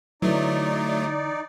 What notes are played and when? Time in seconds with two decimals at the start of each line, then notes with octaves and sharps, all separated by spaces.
0.22 D3 E3 F#3 A3 D#4 D5